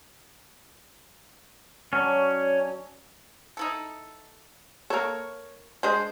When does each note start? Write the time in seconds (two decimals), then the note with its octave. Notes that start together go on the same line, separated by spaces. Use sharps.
1.93 F#3 C#4 D4
3.57 D#4 E4 A4
4.90 A#3 A4 A#4 C#5
5.83 G#3 D4 G#4 C5